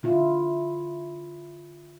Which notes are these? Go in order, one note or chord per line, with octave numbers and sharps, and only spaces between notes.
D3 E4 F4